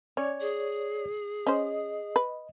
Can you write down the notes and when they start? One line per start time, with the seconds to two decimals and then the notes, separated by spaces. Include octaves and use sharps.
0.17 C#4 C#5 D5 G#6
0.41 G#4
1.47 C#4 C5 D#5
2.16 B4